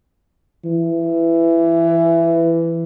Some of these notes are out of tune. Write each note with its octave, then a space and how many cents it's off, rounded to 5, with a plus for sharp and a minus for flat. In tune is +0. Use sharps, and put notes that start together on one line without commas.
E3 +15